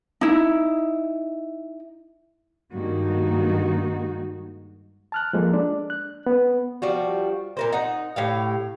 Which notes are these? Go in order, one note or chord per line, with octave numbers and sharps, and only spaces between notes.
D#4 E4
G2 D#3 G#3 A#3 D#4 F#4
A5 F6 F#6
F3 G#3 A#3 A4
D4
F#6
B3
F3 G3 F#4
A#2 A#4 C5
D#4 F#5
A2 G4 F5